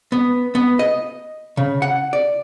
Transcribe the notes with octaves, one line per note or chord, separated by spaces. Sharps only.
B3
B3
D#5
C#3
F#5
D5